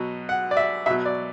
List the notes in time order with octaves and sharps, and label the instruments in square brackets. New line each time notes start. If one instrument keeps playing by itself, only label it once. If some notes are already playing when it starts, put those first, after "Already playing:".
Already playing: [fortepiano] B2 F#3
F#5
D5
E5
B2 F#3 E5
D5